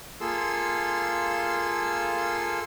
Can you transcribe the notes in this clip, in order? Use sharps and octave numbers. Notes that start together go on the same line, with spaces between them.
A#3 F4 G#4 A4 C6 E6